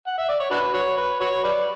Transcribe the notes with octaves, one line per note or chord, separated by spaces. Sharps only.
F#5
E5
D5
C#5
D4 F#4 B4
F#4 C#5
B4
F#4 C#5
B4 D5